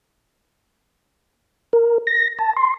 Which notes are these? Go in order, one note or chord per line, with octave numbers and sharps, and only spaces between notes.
A#4
A#6
A5
C6